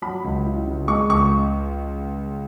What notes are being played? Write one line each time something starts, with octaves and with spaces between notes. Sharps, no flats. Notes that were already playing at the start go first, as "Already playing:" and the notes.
F#3 B5
C#2
E4
C#3
G#3 C#6
C#2 C#6